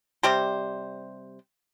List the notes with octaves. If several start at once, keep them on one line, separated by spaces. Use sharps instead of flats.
C3 G3 G4 C5